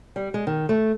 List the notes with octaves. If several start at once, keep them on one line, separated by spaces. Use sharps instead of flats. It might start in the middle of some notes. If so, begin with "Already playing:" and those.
G3
G#3
D#3
A3